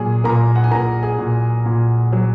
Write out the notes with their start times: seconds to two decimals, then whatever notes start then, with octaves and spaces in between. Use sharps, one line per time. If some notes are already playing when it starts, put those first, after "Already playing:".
Already playing: A#2 F#3 G#4 G#5
0.24 A#2 A#4 A#5
0.55 F#5
0.64 G#5
0.71 A#2 A#4 A#5
1.03 G#4 G#5
1.18 A#2
1.66 A#2
2.12 F#3